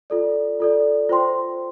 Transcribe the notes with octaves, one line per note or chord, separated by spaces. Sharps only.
F4 A4 D5
F4 A4 D5
F4 C5 G5 C6